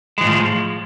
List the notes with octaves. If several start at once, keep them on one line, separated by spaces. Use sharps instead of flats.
A2 E3 F3 G#3